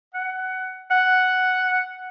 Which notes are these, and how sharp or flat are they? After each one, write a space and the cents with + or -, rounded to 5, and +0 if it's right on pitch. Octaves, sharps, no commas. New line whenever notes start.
F#5 +15
F#5 +0